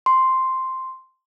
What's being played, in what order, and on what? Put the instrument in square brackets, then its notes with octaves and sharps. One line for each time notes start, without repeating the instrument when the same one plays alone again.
[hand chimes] C6